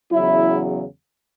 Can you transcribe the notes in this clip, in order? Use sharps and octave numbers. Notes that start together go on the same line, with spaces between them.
E2 C#3 F#3 E4